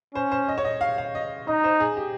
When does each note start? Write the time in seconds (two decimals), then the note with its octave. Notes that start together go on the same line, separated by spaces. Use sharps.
0.15 C#4 C5
0.32 C5
0.48 D#5
0.58 C#5
0.65 D#5
0.81 F5
0.98 F5
1.15 D#5
1.47 D#4 D#5
1.64 C5
1.80 G#4
1.97 G4